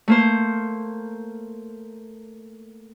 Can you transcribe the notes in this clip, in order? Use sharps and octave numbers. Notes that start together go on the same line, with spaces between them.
A3 A#3 C5